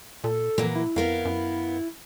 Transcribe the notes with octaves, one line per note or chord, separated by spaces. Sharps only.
A#2 A4
A#2 E3 F#3 A#3
E4
F2 B3 A#4 F5
F#2